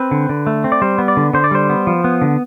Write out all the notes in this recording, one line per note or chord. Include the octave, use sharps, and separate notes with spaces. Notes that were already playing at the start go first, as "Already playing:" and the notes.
Already playing: C4 B4
D3
D3
A3
C4
D5
G3 C5
B3
D5
D3
D3 C5
D5
G3 C5
B3
F3
B3
D3